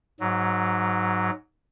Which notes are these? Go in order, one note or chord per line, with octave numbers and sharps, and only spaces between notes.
G#2 F#3